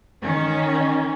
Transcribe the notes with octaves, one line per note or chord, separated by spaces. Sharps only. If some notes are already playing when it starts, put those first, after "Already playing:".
D#3 C#4